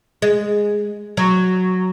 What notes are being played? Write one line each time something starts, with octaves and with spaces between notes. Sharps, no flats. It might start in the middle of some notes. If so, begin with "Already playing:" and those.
G#3
F#3